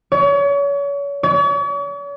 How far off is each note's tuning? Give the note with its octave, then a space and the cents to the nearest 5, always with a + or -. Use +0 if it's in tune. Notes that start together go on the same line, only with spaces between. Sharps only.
C#5 +35
C#5 +45